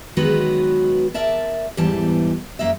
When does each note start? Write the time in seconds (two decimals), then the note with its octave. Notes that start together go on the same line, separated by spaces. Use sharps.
0.17 D#3 F#3 G#3 B3 F#4 B4
1.14 A#4 D5 E5 A5
1.77 E2 G#2 E3 G3 A5
2.59 F#2 A#3 D#5 E5